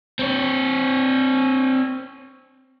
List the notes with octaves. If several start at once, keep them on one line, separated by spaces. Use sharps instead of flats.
C4 C#5